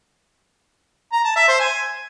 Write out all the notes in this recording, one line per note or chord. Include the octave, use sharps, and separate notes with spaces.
A#5
A5
E5
C5
G#5